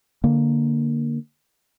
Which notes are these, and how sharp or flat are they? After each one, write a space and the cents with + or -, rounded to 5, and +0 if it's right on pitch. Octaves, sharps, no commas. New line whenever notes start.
D3 +0 A#3 +0